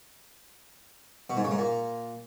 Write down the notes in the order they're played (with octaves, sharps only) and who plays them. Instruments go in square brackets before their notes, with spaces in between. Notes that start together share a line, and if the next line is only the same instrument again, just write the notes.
[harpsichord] B2
G#2
C#3
G#2
A#2